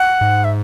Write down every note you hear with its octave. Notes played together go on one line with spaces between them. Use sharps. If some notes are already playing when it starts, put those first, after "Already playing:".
Already playing: F#5
G#2
E5